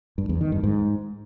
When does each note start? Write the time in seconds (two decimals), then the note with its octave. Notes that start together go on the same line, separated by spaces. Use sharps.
0.18 G2
0.29 E2
0.41 D#3
0.52 G2
0.63 G#2